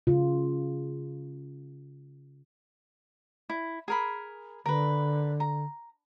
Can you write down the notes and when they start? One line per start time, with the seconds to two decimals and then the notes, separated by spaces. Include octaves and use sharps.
0.07 C#3 F4
3.49 E4
3.88 G#4 A#4 B5
4.66 D3 A#4 B4
5.40 A#5